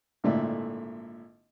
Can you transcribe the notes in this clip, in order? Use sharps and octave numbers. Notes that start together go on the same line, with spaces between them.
G#1 A#2 D3 A3 E4